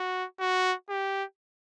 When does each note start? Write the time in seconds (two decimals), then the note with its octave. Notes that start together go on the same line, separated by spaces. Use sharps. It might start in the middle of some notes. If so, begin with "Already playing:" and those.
Already playing: F#4
0.40 F#4
0.89 G4